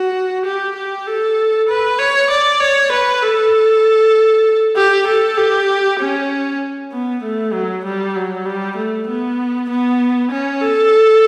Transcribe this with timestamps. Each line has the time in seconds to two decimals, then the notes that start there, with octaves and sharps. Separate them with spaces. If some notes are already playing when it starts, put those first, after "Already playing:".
Already playing: F#4
0.45 G4
0.76 G4
1.07 A4
1.69 B4
1.99 C#5
2.30 D5
2.60 C#5
2.92 B4
3.22 A4
4.76 G4
5.07 A4
5.38 G4
6.00 C#4
6.92 B3
7.23 A3
7.53 F#3
7.85 G3
8.16 F#3
8.46 G3
8.77 A3
9.08 B3
9.70 B3
10.31 C#4
10.62 A4